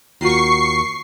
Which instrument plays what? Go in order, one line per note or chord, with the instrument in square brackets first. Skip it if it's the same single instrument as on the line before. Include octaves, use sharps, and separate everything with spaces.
[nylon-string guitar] D#2 F4 F#4 [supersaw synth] C#6 C7